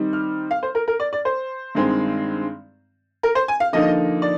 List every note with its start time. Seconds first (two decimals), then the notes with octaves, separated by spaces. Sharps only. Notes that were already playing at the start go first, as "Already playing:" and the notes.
Already playing: D#3 G3 C4 D#4
0.13 F6
0.51 F5
0.63 C5
0.75 A#4
0.88 A#4
1.00 D5
1.13 D5
1.25 C5
1.75 G2 D#3 G#3 C4
3.23 A#4
3.35 C5
3.48 G#5
3.60 F5
3.73 D3 F3 A#3 D#4 D#5
4.22 D5